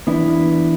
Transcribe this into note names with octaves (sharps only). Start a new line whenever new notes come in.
E2 E3 B3 D4 E4